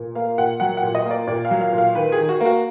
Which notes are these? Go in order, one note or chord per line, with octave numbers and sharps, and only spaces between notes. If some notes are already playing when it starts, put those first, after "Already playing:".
Already playing: A#2
A#3 F5
A#2 F#5
F#3 F#5
F#5
A#2
D#5
A#3
D5
A#2 D5
F5
F#3
F5
A#2
F5
D#3 B4
G#4
D#3
F#4
A#3 F#4